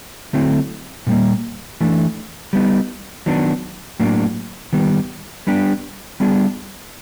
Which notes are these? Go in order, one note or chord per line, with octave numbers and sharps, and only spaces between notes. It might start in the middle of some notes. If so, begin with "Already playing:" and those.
D3 F#3 A3 C4 E4
A#2 G3 A#3
E3 A3 D4
G3 B3 D#4
D#3 F#3 B3 D4
A2 F#3 A#3 D4
D#3 G3 B3
G3 B3 D4 G4
G3 B3 D4 F4 G#4